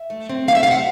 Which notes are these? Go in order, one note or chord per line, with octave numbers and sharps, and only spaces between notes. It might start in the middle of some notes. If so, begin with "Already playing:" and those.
Already playing: E5
A3
C4
A3 F5
E5
F5
C3 F#5